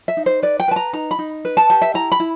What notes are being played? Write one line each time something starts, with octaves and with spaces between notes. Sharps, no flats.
E5
D#4
C5
B4 D5
G5
B4 A5
A#5
D#4 A#5
B5
D#4
B4
A5
G4 A5
E5
E4 A#5
B5
E4